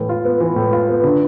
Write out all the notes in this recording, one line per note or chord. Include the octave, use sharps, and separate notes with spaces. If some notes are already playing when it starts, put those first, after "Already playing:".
Already playing: A2 E3
F4
B3
E3
A2
F4
B3
D3